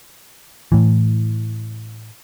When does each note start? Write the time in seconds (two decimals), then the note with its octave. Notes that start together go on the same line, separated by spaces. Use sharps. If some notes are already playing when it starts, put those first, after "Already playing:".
0.72 A2 E3